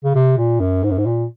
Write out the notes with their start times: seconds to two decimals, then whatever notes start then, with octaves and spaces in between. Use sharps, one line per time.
0.04 C#3
0.15 C3
0.38 A#2
0.60 F#2
0.84 G#2
0.91 F#2
0.98 G#2
1.06 A#2